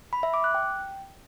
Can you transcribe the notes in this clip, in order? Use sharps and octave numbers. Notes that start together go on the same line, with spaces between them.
B5
E5
D6
F#6
G5